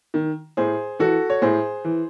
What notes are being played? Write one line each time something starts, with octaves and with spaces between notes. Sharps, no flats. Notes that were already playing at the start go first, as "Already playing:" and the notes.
D#3
A2 G#4 C5
E3 F#4 A4
C#5
A2 G#4 C5
E3